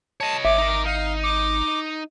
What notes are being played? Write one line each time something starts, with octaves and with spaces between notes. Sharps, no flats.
C#5 D#5 A5
G#1 E5 D6
D#4 A#4
D#4 F5
D6